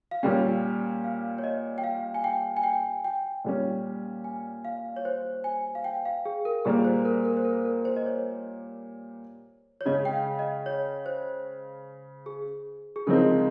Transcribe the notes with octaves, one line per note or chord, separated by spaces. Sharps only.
F5
A#2 G3 C#4 G5
F5
C#5
D#5
G5
F5
G#5
G5
G#5
G5
G5
A#2 G3 C#4
G#5
F5
C#5
C5
G#5
F5
G5
F5
G#4
A#4
A#2 G3 A#3 G#4
C5
A#4
A#4
C5
A#4
A#4
C5
D#5
C#5
C#5
C#3 G#3 C#4 D#5
G5
F5
D#5
C#5
C5
G#4
G#4
C#3 F3 G#3 C4 D#4 A#4